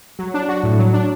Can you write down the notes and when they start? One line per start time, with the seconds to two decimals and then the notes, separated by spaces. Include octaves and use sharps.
0.19 F#3
0.34 D4
0.49 F#4
0.63 A2
0.79 F#3
0.93 D4